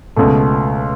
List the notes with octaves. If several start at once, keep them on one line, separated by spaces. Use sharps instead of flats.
C#2 B2 A3